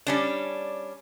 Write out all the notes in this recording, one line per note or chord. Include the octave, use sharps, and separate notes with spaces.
G3 C#4 D4